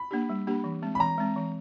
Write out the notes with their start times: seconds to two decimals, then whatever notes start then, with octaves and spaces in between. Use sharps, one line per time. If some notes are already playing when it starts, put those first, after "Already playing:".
Already playing: B5
0.11 A#3 D4 G4
0.29 G3
0.47 A#3 D4 G4
0.64 E3
0.82 G#3 C4
0.95 B5
0.99 E3 A#5
1.18 G#3 C4
1.36 E3